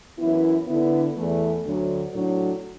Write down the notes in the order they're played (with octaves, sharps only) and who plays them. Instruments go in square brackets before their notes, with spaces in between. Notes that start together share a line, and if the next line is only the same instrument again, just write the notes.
[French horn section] F#2 E3 B3 E4
D3 B3 E4
E2 E3 A3
D2 D3 F#3
A2 F#3 D4